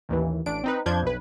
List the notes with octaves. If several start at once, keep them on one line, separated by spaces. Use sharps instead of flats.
A1 D#2 E3
A1 D4 D7
C4 D#4 B4
F2 F3 D4 G6 G#6
B1 B4